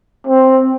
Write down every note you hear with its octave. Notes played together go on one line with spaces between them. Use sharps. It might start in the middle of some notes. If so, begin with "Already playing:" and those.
C4